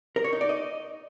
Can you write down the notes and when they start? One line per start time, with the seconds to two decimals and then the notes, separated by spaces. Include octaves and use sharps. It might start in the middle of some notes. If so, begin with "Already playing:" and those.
0.16 A#4
0.24 C#5
0.33 D#4
0.41 D5
0.49 D#5